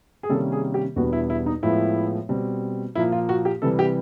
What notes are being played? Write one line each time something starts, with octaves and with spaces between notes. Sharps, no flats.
G#4
C3 D#3 G3 A#3 C#4 A4
G#4
G4
E2 B2 G3 B3 D4 F#4
E4
E4
D#4
A2 F3 G#3 B3 E4
B2 G3 C4
A#2 F3 A#3 E4
F4
F#4
G4
C3 E3 G3 A4
G4